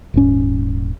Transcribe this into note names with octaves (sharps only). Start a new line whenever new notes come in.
D#1 G#2 C#4